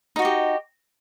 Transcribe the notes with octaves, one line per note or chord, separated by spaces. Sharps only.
D#4 F#4 G4 D#5